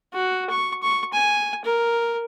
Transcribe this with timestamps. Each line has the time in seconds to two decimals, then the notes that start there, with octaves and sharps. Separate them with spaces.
0.13 F#4
0.50 C#6
0.82 C#6
1.13 G#5
1.65 A#4